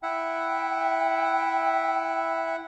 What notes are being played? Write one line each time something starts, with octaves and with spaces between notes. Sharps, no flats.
E4 E5 F#5 G5